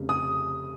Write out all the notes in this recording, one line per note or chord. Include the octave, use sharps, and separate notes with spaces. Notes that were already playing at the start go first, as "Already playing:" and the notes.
Already playing: F1 F2 C#3
D#6